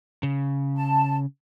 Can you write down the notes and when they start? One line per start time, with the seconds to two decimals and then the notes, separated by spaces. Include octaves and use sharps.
0.23 C#3
0.76 A5